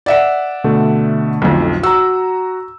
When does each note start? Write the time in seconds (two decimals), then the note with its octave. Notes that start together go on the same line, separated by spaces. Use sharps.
0.06 D5 E5 F#5
0.64 B2 D3 A3
1.42 B1 F2
1.83 F#4 A#5 E6